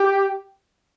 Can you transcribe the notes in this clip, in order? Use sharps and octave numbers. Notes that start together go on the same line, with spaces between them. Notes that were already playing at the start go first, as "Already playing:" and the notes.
Already playing: G4